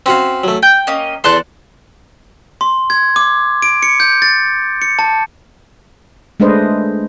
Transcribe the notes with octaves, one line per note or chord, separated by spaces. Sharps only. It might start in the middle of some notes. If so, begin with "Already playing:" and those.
C4 C#4 F#4 F5
F#3 A3
G5 G6
A#3 C#4 D#5
E2 A4 D5 A5 C6 F#6
C6
G#6
D6
D7
C#7
G6
A6
C#7
A5
G#3 A3 D4 B4 C5 D#5